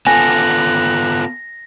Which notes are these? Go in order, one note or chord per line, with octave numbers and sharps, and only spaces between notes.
B3 F4 A4 G#5 F#6 A#6